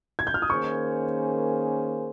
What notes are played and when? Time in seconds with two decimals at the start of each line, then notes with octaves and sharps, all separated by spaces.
0.19 G#6
0.27 G6
0.34 F6
0.42 D#6
0.50 D#3 A#3 C#4 G#4 C5 C#6